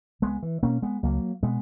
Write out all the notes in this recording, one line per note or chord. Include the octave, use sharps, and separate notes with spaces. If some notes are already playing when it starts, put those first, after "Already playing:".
C#2 G#3 B3
E3
B2 A#3 C#4
G#3 B3
C#2 F#3 A#3
B2 G#3 B3